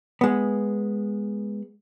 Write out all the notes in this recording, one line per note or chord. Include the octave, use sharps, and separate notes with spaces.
G#3 B3